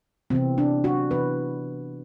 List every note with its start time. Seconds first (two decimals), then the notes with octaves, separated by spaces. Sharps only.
0.30 C3 E3 B3 C4
0.58 D4
0.84 F#4
1.11 C3 E3 B3 B4